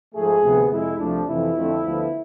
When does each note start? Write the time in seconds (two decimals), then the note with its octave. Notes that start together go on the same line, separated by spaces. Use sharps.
0.14 G#2 F3 A3 G#4
0.42 D2 C3 F3 B3
0.70 F2 C3 G#3 E4
0.98 C2 C3 F3 A3 D4
1.26 F2 C3 E3 E4
1.55 F2 D3 A3 C4
1.82 D2 D3 F3 B3